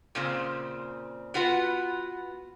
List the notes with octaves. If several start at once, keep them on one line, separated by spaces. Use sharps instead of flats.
A#2 C#3 C4
B3 F4 F#4 B4 F#5